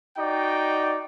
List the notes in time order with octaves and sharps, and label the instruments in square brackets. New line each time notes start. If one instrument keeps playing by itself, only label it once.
[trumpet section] D#4 F#4 D5 G5